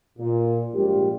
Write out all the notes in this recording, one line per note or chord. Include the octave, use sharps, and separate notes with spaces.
A#2
A#1 G#2 G3 F4 G4